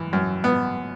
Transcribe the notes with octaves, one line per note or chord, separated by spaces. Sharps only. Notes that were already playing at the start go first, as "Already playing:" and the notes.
Already playing: F#2 E3
F#2
B3